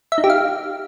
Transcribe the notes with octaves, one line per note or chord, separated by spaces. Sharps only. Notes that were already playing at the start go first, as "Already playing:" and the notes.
E5
D#4
G4
F5